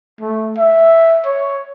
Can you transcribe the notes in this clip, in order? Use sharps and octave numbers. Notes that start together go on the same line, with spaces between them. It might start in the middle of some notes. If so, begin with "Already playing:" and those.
A3
E5
C#5